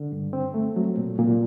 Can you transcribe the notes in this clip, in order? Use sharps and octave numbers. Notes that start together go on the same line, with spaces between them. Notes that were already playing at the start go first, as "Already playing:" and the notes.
Already playing: D3
G2
C4
A3
F#3
A#2
A#2